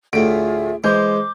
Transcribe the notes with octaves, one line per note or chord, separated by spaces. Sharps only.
D2 A2 F4 G#4 E5 D7
E3 G#3 C5 D6 G6